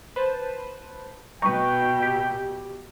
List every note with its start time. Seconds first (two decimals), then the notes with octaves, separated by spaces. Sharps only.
0.16 B4 C5 A5
1.42 B2 D#4 B4 G5 C#6
2.02 G4